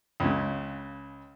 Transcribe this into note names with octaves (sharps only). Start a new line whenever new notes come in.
C#2 C#3